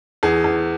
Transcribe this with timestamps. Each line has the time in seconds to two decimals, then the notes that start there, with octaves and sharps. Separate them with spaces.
0.23 E2 G#4
0.44 E2